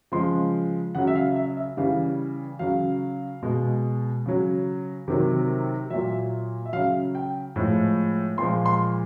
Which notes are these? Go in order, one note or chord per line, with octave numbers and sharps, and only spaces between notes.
C#3 F3 G#3 C6
C#3 F#3 F#5
E5
F5
E5
E5
C#3 E3 G3 F5
C#3 F#3 F5
B2 G#3
C#3 F#3
C3 D#3 F#3
A#2 F#3 E5
E5
C#3 F#3 F5
G5
A2 F3 G#3
A#2 F3 G#3 C6
C6